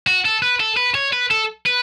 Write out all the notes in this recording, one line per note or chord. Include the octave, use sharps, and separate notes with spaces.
F#4
A4
B4
A4
B4
C#5
B4
A4
B4